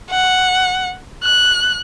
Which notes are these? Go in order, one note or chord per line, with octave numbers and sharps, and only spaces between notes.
F#5
F#6